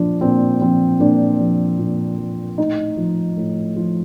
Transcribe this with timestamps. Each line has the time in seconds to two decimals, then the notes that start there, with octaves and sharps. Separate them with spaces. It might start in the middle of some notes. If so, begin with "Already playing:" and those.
Already playing: A#2 F3 D4
0.21 A#2 C4
0.61 F3 C4
1.00 A#2 D4
1.40 F3
1.79 A#2
2.18 F3
2.58 A2 D#4
2.97 F3
3.37 A2
3.76 F3